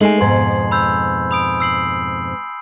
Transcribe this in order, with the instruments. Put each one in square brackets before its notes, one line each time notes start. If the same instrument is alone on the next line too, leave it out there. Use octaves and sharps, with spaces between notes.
[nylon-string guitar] G#3 A3 D#4 [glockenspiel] G#5 C7 F#7
[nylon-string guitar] F2 G#2 B2 [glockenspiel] C6 G#6
[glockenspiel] B5 E6 G6
B5 D#6 D7
E6 C7 F#7